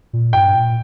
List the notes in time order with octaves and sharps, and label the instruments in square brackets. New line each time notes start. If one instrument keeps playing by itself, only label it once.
[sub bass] A#2
[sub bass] G2 [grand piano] G5
[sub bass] A#2